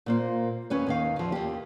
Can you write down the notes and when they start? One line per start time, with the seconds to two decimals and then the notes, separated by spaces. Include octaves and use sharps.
0.06 A#2 A#3 C5
0.70 D#2 C#4 B4 C#5
0.87 D#2 D#3 F5
1.19 E2 F3
1.32 D#2 G4